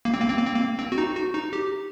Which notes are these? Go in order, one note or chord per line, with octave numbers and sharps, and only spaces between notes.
A#3
C4
A#3
C4
A#3
C4
A#3
C4
F#4
D#4
F#4
D#4
G4